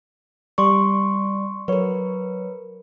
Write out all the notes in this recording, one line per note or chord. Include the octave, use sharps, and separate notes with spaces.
G3 D5 C6 C#6
F#3 A#4 B4 C#5